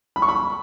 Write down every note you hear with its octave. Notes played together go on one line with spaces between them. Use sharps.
B5
C#6
B5